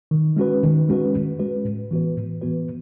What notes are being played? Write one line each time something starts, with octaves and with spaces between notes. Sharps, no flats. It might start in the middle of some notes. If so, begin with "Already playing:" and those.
D#3
G#3 C#4 F#4 B4
D#3
G#3 C#4 F#4 B4
D#3
G#3 C#4 F#4 B4
A2
E3 B3 F#4 B4
A2
E3 B3 F#4 B4